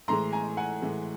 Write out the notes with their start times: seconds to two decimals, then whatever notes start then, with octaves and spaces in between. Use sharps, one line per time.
0.08 A2 E3 G#3 A#5 C6
0.32 G#5 A#5
0.57 F#5 G#5
0.82 A2 E3 G#3